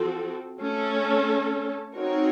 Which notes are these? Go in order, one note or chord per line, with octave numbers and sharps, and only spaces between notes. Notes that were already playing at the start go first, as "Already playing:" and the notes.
Already playing: F3 C4 F#4 A4
A3 C#4 A4
C4 D#4 F#4 A#4 C#5